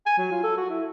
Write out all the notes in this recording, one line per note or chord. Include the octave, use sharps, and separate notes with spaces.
G#5
F#3
F4
A4
F#4
E4